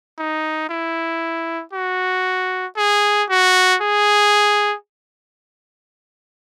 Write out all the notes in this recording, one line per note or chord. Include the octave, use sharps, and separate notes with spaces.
D#4
E4
F#4
G#4
F#4
G#4